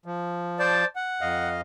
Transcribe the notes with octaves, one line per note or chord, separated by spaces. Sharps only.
F3
C5 D5 A5
F#5
F2 D#5 F5